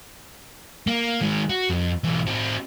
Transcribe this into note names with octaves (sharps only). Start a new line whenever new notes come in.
A#3
D#3 G#3
F#4
F2
B1 E3
C4 F#4